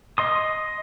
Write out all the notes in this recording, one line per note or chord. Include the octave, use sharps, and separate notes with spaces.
D#5 C6 D#6